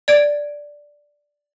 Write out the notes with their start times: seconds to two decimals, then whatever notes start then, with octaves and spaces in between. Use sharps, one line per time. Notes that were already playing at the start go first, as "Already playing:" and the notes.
0.08 D5 G#6 D7